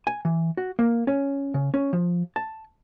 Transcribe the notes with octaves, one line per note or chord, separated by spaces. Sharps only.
G#5
E3
F#4
A#3
C#4
C#3
C#4
F3
A5